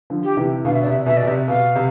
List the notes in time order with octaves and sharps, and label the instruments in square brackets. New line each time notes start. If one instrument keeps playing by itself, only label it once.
[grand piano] D3 F3
[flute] G4
[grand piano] C3 E3
[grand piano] B2 D3 [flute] F5
[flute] E5
D5
[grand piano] C3 [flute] E5
[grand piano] B2 [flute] E5
[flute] D5
[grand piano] B2
[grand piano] C3 [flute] E5
[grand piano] B2 [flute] F5
[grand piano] C3